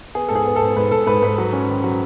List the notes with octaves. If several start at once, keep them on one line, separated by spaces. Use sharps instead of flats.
B3 G#4
G#2 A4
G#4
B3
A4
G#2
G#2 B4
G#2 A4
G#2 B4
G#2 B4
F#3
C#4
D#3
F#3